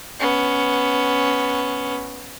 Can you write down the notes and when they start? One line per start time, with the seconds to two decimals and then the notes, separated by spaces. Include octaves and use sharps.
0.20 B3 C#4